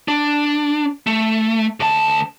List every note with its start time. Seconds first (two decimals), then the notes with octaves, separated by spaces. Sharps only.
0.08 D4
1.07 A3
1.80 D2 A5